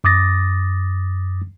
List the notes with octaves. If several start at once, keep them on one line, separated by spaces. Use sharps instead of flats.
F#2 D6 D#6 A6 A#6